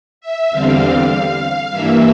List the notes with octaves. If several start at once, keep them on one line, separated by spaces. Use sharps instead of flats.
E5
E2 D3 G3 C4 F5
G2 E3 A#3 E5